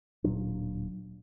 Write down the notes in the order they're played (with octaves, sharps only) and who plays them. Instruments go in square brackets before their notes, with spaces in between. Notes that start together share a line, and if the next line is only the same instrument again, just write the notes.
[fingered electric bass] D1 A#2 F#3 D4